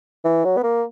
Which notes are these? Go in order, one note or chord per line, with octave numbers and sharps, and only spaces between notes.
E3
F#3
B3
A#3